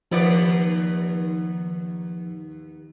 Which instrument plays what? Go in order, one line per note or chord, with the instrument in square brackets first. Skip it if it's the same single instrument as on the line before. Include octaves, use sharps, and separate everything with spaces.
[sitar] D#2 B3 D5 [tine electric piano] F3